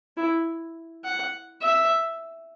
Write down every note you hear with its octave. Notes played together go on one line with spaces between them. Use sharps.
E4
F#5
E5